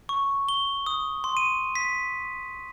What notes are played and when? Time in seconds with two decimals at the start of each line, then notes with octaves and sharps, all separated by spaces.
0.09 C#6
0.49 G7
0.86 D#6
1.24 C6
1.37 D#7
1.76 B6